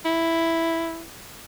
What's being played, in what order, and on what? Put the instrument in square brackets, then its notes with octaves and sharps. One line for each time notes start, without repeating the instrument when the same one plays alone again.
[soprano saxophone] E4